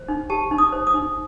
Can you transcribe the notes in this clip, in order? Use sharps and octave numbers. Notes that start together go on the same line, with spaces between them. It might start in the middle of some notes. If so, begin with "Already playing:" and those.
Already playing: C5
D#4
G4 A5
D#4
D#6
C5
D#6
D#4